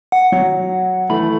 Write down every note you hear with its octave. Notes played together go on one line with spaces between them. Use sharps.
F#5
F#3
E3 A3 B5